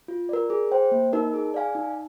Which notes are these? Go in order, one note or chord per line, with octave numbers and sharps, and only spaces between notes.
F4
A#4 D5
G#4
C5 G5
A#3
D#4 A#4 D#5
G#4
D5 F5 G#5
D#4